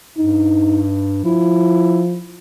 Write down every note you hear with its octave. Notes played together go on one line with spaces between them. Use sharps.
G2 D#4
F3 E4